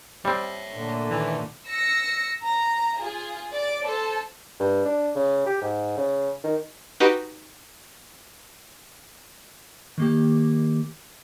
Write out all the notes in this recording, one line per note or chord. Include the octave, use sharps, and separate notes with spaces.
G3 C4 C#5 E5
A#2 D3 A3
D#2 E3
E6 A#6 C#7
A#5
F4 G#4
D5 D6
A4 C5 A5
G2
D4
C#3
G4
G#2
C#3
D#3
D#4 F#4 G4 B4
D#3 A#3 G4